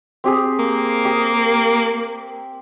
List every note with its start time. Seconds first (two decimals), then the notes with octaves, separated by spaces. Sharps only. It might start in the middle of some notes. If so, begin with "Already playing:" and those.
0.24 C4 G4 G#4
0.59 A#3
1.05 G4 D#6